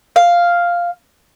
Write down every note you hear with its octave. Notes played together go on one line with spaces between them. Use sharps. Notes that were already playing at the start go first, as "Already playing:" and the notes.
F5